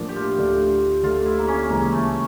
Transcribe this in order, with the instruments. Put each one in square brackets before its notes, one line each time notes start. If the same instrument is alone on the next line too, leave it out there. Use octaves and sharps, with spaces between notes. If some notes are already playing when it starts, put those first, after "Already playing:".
Already playing: [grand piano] A2 F3 A#3 D4 [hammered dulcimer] D5
[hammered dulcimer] G4
F4
[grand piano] D2 D3 A3 D4
[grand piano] D2 D3 A3 [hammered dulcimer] F4
[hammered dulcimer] E4
A#3
C#4
[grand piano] C#2 C#3 E3 [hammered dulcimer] A#3
[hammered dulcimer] A3